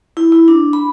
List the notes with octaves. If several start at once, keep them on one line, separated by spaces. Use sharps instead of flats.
E4
E4
D4
B5